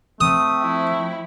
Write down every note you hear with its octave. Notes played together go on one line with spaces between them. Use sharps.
A3 C4 D#6
F3 E4